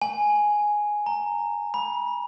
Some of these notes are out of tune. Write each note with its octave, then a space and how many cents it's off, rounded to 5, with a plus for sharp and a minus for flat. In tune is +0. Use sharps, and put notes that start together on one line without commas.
G#5 +5
A#5 -15
B5 -35